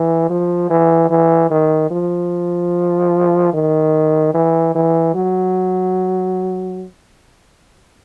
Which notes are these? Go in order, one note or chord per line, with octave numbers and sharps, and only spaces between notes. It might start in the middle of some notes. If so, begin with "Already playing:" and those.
Already playing: E3
F3
E3
E3
D#3
F3
D#3
E3
E3
F#3